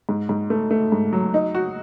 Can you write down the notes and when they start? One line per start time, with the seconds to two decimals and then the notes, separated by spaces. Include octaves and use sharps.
0.09 G#2
0.29 G#2
0.50 A3
0.71 A3
0.92 G#2
1.13 F#3
1.34 D#4
1.55 F#4